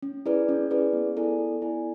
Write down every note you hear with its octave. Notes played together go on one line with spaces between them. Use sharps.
C#4
E4 G#4 B4 D5
C#4
E4 G#4 B4 D5
B3
E4 A4 D5 G#5
B3
E4 A4 D5 G#5